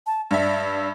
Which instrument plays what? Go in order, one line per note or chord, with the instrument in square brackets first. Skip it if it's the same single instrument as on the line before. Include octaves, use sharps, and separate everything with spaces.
[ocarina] A5
[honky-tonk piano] G2 E5 [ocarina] D5